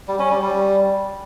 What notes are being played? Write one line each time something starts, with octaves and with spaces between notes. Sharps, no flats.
G3
C#4
G3
G3